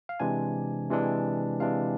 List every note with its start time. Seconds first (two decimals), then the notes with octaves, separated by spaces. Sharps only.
0.09 F5
0.20 C3 E3 G#3 D4 G#5
0.91 C3 E3 G#3 D4
1.60 C3 E3 G#3 D4 F5